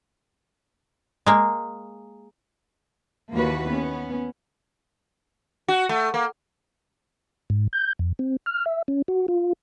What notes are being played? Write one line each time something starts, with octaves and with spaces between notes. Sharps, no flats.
G#3 A#3
D#2 E3 A#3 F#4 B4
B3 C#4
F#4
A3
A#3
G#2
G6
F2
C4
F6
E5
C#4
F#4
F4